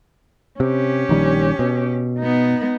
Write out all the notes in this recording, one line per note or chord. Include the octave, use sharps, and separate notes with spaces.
C3 C#4 G4
A#1 D#3 G3
B2
B3 D#4